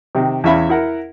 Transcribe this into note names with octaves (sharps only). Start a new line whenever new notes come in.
C3 D#3
E2 C#4 E4 E5 F5 B5
E4 A#4 F#5